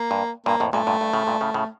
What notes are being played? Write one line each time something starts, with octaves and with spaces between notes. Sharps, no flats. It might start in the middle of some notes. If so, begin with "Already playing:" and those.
Already playing: A#3
G2
G2 A#2 A#3
F2 A2
G2 A#2 A3
G2 A#2
G2
A2 C#3
G2 A#2
A2 C#3
A2 C#3